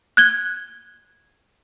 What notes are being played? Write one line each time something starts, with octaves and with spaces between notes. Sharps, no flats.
F#6 G#6 G7